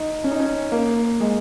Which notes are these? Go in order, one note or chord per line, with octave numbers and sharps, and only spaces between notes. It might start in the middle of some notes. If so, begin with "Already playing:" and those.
Already playing: D#4
C#4
D#4
C#4
A#3
G#3